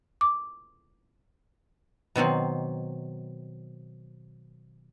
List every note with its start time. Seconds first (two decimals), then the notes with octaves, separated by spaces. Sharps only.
0.21 D6
2.16 B2 D#3 F#3 C4